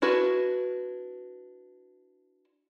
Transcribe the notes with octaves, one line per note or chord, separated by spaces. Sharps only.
D4 E4 F#4 B4